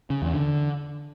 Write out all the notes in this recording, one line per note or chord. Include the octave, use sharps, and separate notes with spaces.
C#3
E2
D3